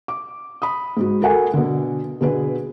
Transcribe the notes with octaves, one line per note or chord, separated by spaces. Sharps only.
D6
B5 D#6
G#2 F#4
F#4 A4 A#4 F#5 G#5
B2 D3
B2 D3 G#4 B4